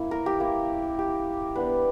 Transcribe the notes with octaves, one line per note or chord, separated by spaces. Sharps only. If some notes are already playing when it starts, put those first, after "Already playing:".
Already playing: A#3 C#4 E4
A#4
G4
A#3 E4
G4
G3 B3 D4 B4